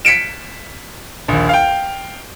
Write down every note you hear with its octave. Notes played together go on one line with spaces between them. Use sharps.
B6 C#7 D7 E7
A#1 D#2
F5 G5